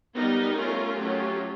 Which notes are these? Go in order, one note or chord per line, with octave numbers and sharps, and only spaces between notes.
G3 B3 D#4 A#4
A3 C#4 F4
F#3 A3 C#4 F4 G4